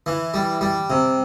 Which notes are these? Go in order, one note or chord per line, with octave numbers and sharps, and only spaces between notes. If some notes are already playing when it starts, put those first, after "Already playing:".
E3
G3
G3
C3